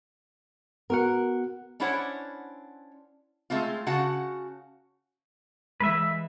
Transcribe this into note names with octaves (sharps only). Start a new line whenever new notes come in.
B3 F#4 A#4 F#5
C#4 D4 E4 C5 C#5 F#5
G#3 A3 C4 F4
C#3 F#4 F#5 A5
E3 G#3 B4 E5